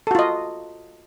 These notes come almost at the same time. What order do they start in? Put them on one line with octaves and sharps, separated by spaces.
A4 F#4 F4 D#5